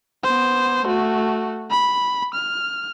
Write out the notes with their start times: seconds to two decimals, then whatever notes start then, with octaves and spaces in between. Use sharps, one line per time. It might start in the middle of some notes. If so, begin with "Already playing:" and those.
0.24 B3 C5
0.86 A3 F#4
1.71 B5
2.35 F6